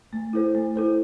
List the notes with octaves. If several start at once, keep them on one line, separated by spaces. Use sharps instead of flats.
A3
E4 A4 C5
A3
E4 A4 C5